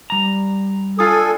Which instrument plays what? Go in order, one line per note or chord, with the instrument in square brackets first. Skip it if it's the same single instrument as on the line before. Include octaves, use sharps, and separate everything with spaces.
[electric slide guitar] G3 A#5
[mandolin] D4 F4 D#6 [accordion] A4 G#5